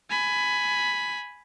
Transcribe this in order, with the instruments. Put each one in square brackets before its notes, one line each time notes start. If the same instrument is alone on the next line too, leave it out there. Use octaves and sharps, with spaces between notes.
[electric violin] G#5 B5